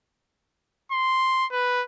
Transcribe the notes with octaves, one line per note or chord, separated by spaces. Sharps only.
C6
B4